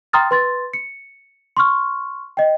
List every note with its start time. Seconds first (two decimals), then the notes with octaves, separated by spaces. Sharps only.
0.13 G5 A#5 C6 D#6 F6 A6
0.31 B4 C6 A6
0.73 C#7
1.57 C6 C#6 F6
2.37 D#5 G5